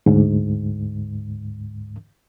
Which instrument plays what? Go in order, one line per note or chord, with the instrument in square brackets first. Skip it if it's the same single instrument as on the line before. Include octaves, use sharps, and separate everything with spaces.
[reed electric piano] D2 G#2